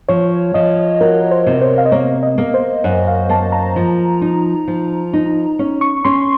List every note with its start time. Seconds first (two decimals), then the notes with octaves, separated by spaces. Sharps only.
0.09 F3 C#5
0.54 F3 D#5
1.01 F#4 A#4
1.31 C5
1.46 C3
1.62 C5
1.78 F5
1.85 D#5
1.92 A#3 C#5
2.23 D#5
2.38 A#3
2.54 C5
2.84 F#2
3.07 F5
3.29 A#3 A5
3.52 A#5
3.76 F3
4.22 D#4
4.68 F3
5.13 D#4
5.59 C#4
5.81 C#6
6.05 C#4 C6